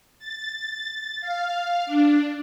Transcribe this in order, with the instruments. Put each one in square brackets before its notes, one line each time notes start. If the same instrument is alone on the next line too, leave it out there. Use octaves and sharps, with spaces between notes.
[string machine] A6
F5
D4